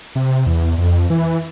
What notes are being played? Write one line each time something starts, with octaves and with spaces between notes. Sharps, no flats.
C3
E2
F2
E3